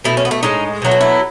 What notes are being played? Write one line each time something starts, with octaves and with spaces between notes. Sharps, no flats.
B2 A3 E4
C#4
B3
A3
A2 G#3 D#4
B2 F#3 A3
F#4
E4